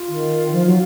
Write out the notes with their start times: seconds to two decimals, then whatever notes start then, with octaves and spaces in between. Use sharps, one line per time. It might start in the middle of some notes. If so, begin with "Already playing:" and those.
Already playing: F4
0.08 D#3
0.52 F3
0.65 F#3